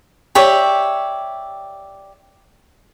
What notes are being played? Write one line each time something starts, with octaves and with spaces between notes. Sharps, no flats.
G4 C#5 D5 E5